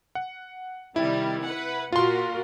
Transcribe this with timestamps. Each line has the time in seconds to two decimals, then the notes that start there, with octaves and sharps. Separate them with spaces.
0.15 F#5
0.96 C3 D#3 G3 E4
1.44 B4 F#5
1.92 A#2 F4 F#4 A#4 C6